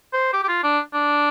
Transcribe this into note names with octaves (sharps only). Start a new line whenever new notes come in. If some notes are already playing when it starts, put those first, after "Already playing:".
C5
G4
G4
F4
D4
D4